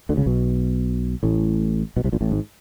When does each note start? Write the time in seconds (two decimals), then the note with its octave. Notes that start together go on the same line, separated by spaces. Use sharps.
0.09 D2 D3
0.17 C#2 C#3
0.26 B1 B2
1.23 A1 A2
1.96 B1 B2
2.04 C2 C3
2.12 A#1 A#2
2.21 A1 A2
2.31 G#1 G#2